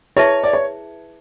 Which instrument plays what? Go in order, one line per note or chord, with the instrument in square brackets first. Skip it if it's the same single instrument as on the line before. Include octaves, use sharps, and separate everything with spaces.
[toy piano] E4 G#4 B4 E5 A5 [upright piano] C#5
[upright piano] D5
C#5